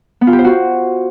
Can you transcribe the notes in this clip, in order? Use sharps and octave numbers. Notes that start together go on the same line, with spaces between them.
B3
F4
G4
C5
F#4